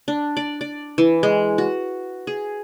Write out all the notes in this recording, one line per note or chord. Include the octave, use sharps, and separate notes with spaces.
D4
D5
D5
E3
G#3
F#4
G#4